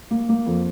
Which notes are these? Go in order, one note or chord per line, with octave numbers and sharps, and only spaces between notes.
A#3
A#3
F2